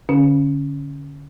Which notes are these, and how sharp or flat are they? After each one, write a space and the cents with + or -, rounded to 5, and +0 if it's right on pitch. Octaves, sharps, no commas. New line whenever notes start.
D3 -20 C#4 +0